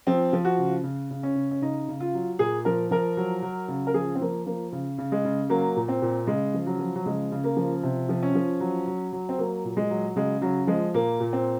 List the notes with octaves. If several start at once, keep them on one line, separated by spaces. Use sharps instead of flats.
F3 C4
F3
F#4
C#3
C#3
C#3
C#4
C#3
C#4
C#3 D#4
C#3
F4
F#3
A#2 G#4
F3 A#4
F3 A#4
F#3
F#3
C#3
A#4
F3 G#4
C4
F3 A#3
F3 A#3
C#3
C#3
G#3
C#3
F#3 A#3
A#2
C4
A#2
C#3 G#3
F3
F#3
F3
F#3
C#3 G#3
C#3
A#3
F3
C3
F3
C#4
F3
F#3
F#3
F#3
C4
F#3 A#3
A#2
G#3
F#3
C#3 G#3
C#3 F#3
F3 G#3
A#2 A#3
A#2
C4